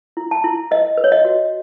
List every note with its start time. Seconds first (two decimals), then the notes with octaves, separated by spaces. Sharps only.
0.17 E4
0.31 A5
0.44 E4
0.71 B4 D#5
0.97 B4
1.04 C#5
1.12 D#5
1.25 F#4